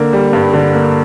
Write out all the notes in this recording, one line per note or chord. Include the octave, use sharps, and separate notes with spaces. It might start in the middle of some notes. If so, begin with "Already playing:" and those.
Already playing: D3 A#3
G3
G2
D3
A#3